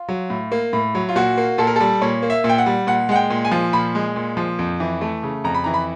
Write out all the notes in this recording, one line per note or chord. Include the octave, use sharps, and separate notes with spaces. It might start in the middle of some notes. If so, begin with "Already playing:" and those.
Already playing: F4
F#3
A2
A#3
A2
F#3
F4
A#2 F#4
A#3
A#2 A4
A#4
G3 A4
A#2 C#5
A#3
E5
A#2
G5
F#5
G3
A#2 F#5
G#3 F#5
G5
A#2
G#5
F3
A#2 B5
G#3
A#2
F3
F2
E3
A3
C#3
F2 A#5
B5
E3 A#5
B5